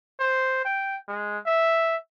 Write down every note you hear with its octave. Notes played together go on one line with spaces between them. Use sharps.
C5
G5
G#3
E5